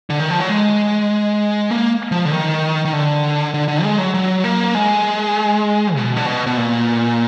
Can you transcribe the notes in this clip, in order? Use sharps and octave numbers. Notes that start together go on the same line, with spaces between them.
D3
D#3
F3
F#3
G#3
A#3
F3
D3
D#3
D#3
D3
D3
D3
G#3
F#3
F#3
A#3
G#3
B2
D3
B2
B2
A#2